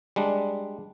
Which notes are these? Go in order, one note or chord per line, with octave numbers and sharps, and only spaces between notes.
G3 G#3 D4